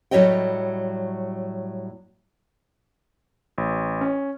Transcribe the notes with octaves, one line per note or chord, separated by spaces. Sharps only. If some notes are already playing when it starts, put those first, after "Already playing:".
A2 F#3 G3 C#5 D#5 G5
A1
C#4